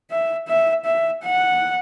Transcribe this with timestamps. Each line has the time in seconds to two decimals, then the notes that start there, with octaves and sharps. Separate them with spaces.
0.11 E5
0.48 E5
0.85 E5
1.22 F#5